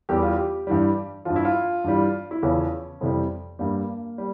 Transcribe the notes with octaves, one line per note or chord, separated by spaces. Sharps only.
E2 E3 G3 G4
F4
G4
G2 E3 G3
G2 F3 F4
E4
F4
G2 E3 G3
E4
E2 C#3 F3 C#4
F2 C3 E3 G3
G2 G3 A#3
G3